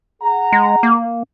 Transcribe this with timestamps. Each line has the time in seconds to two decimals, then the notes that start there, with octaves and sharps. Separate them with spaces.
0.22 G#4 F#5 A#5
0.53 G#3
0.83 A#3